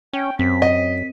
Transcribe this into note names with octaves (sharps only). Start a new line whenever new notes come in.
C#4 G5
F#2 C4 B6
D#5